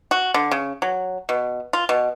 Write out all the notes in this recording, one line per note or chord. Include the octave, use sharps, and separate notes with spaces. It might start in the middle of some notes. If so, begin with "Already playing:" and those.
F#4
D3
C#3
F#3
B2
F4
B2